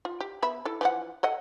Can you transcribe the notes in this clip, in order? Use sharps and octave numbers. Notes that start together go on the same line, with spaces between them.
F4
G4
B3 E5 B5
E4 A4
E3 F3 F#5
A4 D#5 F#5